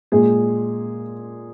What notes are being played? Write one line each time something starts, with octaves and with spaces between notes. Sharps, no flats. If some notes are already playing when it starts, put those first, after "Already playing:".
A#2 G#3 G#4